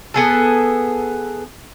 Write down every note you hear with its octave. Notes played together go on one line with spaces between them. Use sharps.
B3 G#4 A4